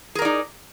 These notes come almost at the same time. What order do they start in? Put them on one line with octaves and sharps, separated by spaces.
G#4 A#4 D5 D#4